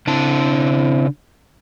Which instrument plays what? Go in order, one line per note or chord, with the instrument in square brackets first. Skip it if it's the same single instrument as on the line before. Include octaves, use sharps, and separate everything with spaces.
[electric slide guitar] C#3 D4 A5 [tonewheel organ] C4 E4